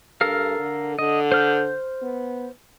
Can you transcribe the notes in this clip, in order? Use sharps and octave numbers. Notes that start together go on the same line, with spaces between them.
G2 A4 A#4 F5
D3
D3 D#5
C5 F6 G6
B3